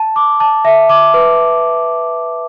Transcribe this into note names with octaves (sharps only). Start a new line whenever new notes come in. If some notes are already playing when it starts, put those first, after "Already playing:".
Already playing: A5
D6
A5
E5
D6
B4